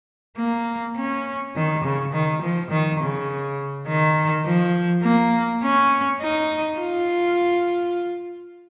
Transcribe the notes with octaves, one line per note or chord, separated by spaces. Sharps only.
A#3
C#4
D#3
C#3
D#3
F3
D#3
C#3
D#3
F3
A#3
C#4
D#4
F4